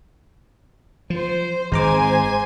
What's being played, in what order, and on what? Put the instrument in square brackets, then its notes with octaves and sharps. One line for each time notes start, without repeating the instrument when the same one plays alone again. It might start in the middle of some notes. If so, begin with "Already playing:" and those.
[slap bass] F3 [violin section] C5
[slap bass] G#1 [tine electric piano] G#3 A#5 D6 [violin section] C5 G#5